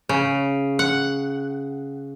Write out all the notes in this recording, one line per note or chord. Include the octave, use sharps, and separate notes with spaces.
C#3
F#5